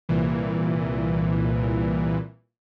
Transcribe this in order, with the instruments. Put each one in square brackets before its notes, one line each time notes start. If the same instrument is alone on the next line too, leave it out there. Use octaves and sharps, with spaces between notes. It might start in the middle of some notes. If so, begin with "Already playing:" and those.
[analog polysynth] C2 A#2 E3